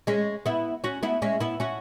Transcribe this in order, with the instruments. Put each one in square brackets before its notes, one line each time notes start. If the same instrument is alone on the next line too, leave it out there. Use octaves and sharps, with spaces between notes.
[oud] G#3 C#4
B3 E4
C#4 F#4
B3 E4
G#3 C#4
B3 E4
C#4 F#4